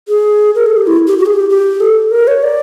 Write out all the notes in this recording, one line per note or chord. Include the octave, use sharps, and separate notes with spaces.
G#4
A#4
A4
G4
E4
G4
F#4
G#4
G4
G4
A4
A#4
C#5
D5